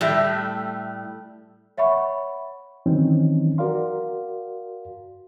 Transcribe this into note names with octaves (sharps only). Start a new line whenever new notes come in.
A2 G3 A3
C#5 E5 F#5 B5 C#6
D#3 E3 F#3 C4 C#4 D#4
F#4 A#4 D5 F5 C6